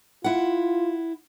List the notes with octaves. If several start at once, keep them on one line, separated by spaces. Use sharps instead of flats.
E4 F4 F#5